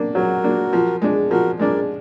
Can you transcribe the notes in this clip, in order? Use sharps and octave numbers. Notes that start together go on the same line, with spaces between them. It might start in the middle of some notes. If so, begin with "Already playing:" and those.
Already playing: A#3 D4
F#3 F#4 A#4
A#3 D4
F3
G#3 D4
F3 F#4 A#4
G#3 D4 A#4 D5